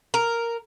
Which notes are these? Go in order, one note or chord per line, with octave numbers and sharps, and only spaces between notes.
A#4